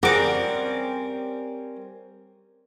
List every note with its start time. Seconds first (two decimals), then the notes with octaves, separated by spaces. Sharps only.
0.03 G3 C4 C#4 G#4 A#4 F#5 D6